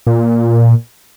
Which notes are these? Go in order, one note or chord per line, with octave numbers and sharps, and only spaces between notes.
A#2